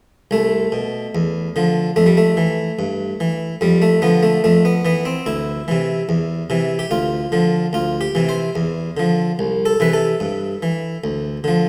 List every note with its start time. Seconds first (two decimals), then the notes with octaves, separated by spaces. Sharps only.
0.31 C2 A3
0.72 B2
1.15 E2
1.56 D3 F3
1.96 F2 A3
2.06 G3
2.17 A3
2.37 E3
2.79 G2
3.20 E3
3.61 F2 G3
3.82 A3
4.02 D3 F3 B3
4.23 A3
4.44 F2 A3
4.65 B3
4.85 E3 B3
5.05 C4
5.26 D2 E4
5.68 C3 E3
6.09 E2
6.50 C3 E3
6.79 G4
6.91 D2 F4
7.32 D3 F3
7.73 D2 F4
8.01 G4
8.15 C3 E3
8.29 C5
8.55 E2
8.97 D3 F3
9.39 C2
9.65 A4
9.80 C3 E3 B4
9.93 A4
10.20 G2
10.63 E3
11.04 D2
11.44 D3 F3